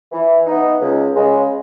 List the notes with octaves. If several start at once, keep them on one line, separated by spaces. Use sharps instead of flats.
E3
B3 D#4
C#2
C#3 G#3